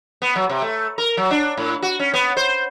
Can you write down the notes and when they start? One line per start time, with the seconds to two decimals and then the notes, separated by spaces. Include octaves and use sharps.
0.22 B3
0.36 F#3
0.50 C3
0.62 A3
0.98 A#4
1.17 F#3
1.31 D4
1.57 A2
1.82 F#4
2.00 C#4
2.14 B3
2.37 C5